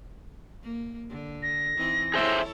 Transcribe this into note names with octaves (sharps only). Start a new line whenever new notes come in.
A#3
D3
A#6
E3 C4 D#4
E4 G#4 A4 C5 C#5 E5